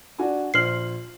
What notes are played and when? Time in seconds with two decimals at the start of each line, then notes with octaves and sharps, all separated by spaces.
0.18 D4 F#4 G#5
0.54 A#1 C5 F6 C7 F#7